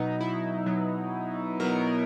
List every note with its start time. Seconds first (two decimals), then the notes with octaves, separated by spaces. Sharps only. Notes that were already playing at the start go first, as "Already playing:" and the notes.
Already playing: B2 F#3 B3 D#4
0.21 E4
0.66 B2 F#3 B3
1.60 B2 F#3 B3 A#4